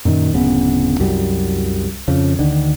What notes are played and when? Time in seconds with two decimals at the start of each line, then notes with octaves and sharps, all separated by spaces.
0.05 F#2 A#2 D3 D#3
0.34 D1 F#2 C#3 B3
1.00 C2 F#2 F#3 G3
2.08 F2 C#3 F3
2.39 D2 D3 D#3